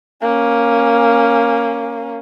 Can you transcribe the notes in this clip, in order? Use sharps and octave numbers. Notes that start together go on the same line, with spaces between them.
A#3 C#4